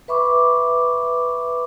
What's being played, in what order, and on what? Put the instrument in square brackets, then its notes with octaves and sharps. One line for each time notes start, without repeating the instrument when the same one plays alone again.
[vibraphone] B4 E5 B5 C#6 D6